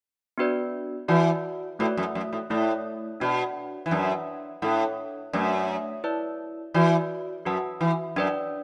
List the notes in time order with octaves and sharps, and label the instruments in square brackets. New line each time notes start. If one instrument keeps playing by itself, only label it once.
[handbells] B3 D4 F#4 B4 D5
[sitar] E3 [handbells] F#4 B4 D5 F#5 A5
[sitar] A2 [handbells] A3 F#4 B4 D5
[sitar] F#2
F#2
A2
[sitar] A2 [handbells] A3 E4 D5
[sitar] B2 [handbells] D4 F#4 D5 A5
[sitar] E3
[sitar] F#2 [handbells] D4 B4 D5 A5
[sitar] A2 [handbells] D4 A4 F#5
[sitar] F#2 [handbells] A3 D4 B4 D5
[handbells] E4 B4 D5 A5
[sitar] E3 [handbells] F#4 B4 D5
[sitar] F#2 [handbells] F#4 B4 F#5 A5
[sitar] E3
[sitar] F#2 [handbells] D4 B4 D5